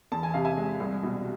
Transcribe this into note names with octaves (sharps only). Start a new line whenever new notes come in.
E2 A5
G#5
C3 F5
E5 G#5
G#3
C2
B2